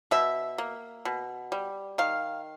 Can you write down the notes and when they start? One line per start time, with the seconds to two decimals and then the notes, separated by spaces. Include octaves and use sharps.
0.11 B2 E5
0.58 A#3
1.05 B2
1.52 G3
1.98 D#3 F5